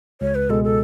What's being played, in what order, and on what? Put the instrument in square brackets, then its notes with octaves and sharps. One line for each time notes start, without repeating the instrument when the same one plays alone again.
[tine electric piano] C#2 [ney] C#5
[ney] B4
[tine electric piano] B2 G#3 [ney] A4
[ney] A4